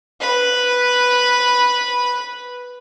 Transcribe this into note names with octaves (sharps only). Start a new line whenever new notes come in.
B4 B5